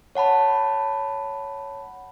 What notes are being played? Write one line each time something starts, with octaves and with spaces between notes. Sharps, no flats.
C#5 F#5 A5 B5